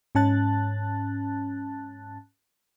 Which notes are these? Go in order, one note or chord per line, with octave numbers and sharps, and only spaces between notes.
G#2 C#4 A5 F#6 A6